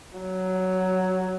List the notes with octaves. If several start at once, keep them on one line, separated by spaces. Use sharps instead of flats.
F#3